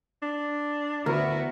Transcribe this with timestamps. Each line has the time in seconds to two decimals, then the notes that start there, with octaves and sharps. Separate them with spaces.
0.22 D4
1.06 D2 B3 E4 F#4 A#4